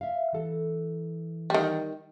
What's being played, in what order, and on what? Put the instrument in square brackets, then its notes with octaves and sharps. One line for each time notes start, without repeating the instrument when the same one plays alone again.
[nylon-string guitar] E5 F5
E3 A4
[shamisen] D#3 G3